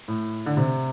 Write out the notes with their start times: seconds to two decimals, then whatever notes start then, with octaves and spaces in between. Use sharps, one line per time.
0.08 A2
0.46 D3
0.57 C3